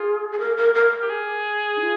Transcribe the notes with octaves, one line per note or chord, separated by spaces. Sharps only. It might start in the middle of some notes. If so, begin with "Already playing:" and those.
Already playing: F4 G#4
G#4
A#4
A#4
A#4
G4
G#4
D#4
F4